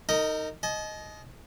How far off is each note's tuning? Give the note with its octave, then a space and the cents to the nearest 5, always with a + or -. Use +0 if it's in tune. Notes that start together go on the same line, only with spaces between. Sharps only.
D#4 +0 A#4 -35 D#5 +0
D#5 +0 A5 -45